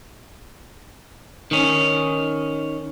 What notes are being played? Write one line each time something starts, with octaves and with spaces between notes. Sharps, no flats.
D#3 C#4